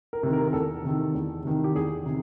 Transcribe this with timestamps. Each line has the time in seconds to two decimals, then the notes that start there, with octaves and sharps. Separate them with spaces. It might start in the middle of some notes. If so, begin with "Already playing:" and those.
0.13 A#4
0.23 C3 D#3
0.33 A#4
0.48 A#4
0.53 E2 A4
0.84 C3 D#3
1.15 E2
1.45 C3 D#3
1.64 G4
1.75 E2 G#4
2.06 C3 D#3